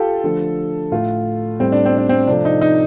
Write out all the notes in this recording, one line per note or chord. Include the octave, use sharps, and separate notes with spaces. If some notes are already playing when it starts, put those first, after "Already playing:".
Already playing: F4 G4 A4
D3 F3 A3
A2 A3 F4
A2 G3 C4
D4
C4
D4
C4
C3 F3 A3 D4
D#4
D#4